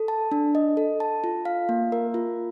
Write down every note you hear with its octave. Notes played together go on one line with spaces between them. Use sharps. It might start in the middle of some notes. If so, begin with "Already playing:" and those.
Already playing: A4
A5
D4
D#5
A4
A5
F4
F5
A#3
A#4
F4